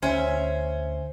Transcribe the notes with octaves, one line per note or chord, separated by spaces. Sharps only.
D2 C#4 C5 E5